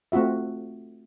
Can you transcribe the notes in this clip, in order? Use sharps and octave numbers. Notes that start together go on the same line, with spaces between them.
A3 C4 F4 F#4 E5